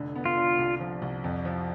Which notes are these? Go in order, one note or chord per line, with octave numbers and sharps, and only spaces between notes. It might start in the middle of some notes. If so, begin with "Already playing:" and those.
Already playing: F1 D3
B3
F4
D3
C2
F3
C2
F2
F3